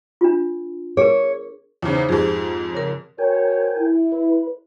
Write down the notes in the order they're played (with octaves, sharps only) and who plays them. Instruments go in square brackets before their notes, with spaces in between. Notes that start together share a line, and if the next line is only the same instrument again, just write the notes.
[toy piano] D4 F4
[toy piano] G#4 A#4 [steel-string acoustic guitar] C#5
[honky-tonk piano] E2 C#3 [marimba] D#4 C5
[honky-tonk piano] F2 G#2 [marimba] G4 G#4
[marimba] C#3 A#4
[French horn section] F#4 C5 C#5 [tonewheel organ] A#4 G5 G#5
[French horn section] E4
[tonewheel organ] B4